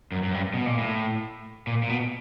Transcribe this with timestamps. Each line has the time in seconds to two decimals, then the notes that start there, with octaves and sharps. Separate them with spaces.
0.12 F#2
0.23 F#2
0.34 G2
0.54 B2
0.66 A#2
0.78 A2
1.67 A#2
1.83 A#2
1.89 B2